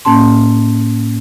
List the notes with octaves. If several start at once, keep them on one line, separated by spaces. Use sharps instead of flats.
A2 A#3 C#4 A5 C6